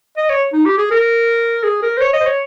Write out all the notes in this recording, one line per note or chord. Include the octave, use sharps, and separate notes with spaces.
D#5
C#5
D#4
G4
G#4
A#4
G#4
A#4
C5
C#5
D#5
C5
C#5